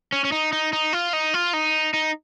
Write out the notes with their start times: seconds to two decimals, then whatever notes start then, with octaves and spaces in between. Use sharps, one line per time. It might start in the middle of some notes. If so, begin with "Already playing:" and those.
0.13 C#4
0.25 C#4
0.32 D#4
0.53 D#4
0.73 D#4
0.93 F4
1.13 D#4
1.34 F4
1.53 D#4
1.94 D#4